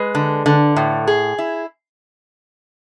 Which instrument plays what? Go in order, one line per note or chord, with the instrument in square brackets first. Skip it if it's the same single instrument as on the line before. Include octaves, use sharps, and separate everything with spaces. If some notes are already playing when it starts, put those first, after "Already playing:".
Already playing: [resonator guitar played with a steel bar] G#3 B4
D3
D3
A2
G#4
E4